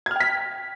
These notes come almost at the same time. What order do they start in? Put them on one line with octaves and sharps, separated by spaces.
G#6 F6 G5 B6